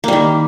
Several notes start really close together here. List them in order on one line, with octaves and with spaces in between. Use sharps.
A#3 G3 D#3